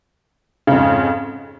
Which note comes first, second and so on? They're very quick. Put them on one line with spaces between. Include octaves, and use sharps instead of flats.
C#3 F2 G#2